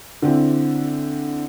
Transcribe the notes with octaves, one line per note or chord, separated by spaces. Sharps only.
D3 C4 E4